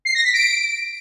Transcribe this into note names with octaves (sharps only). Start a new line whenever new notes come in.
C7
A#6
B6
D7